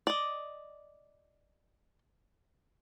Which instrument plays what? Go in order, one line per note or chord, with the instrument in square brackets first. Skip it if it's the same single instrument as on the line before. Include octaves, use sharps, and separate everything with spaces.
[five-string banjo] D5 D#5